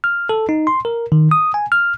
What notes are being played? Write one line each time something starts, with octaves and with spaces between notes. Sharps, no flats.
F6
A4
D#4
C6
A#4
D#3
D#6
G#5
F6